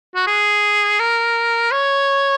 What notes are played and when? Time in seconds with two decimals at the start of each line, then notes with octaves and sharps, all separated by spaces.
0.15 F#4
0.27 G#4
0.99 A#4
1.71 C#5